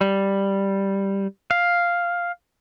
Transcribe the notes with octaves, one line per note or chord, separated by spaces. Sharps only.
G3
F5